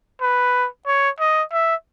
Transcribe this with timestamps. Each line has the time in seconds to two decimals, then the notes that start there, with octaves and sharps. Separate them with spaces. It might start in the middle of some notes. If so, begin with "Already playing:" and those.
0.21 B4
0.86 C#5
1.20 D#5
1.52 E5